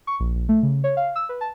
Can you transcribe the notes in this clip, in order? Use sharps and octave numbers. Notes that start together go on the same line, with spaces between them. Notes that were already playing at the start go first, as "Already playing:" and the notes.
C#6
A#1
A#1
A3
C#3
C#5
F5
E6
B4
A5